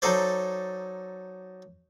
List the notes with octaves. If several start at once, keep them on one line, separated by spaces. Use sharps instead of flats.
F#3 D#4 A4 C5 D5